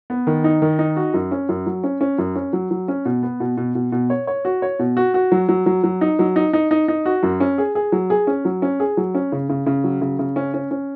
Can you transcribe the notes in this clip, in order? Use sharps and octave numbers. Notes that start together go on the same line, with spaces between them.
B3
D#3
D#4
D#3
D#4
F#4
F#2
C#4
F#2
F#3
C#4
C#4
F#2
C#4
F#3
F#3
C#4
B2
B3
B2
B2
B2
B2
C#5
C#5
F#4
C#5
B2
F#4
F#4
F#3
F#3
F#3
F#3
D#4
F#3
D#4
D#4
D#4
D#4
F#4
F#2
C#4
G#4
G#4
F#3
G#4
C#4
F#3
C#4
G#4
F#3
C#4
C#3
C#3
C#3
F#3
C#3
C#3
C#4
C#4
C#4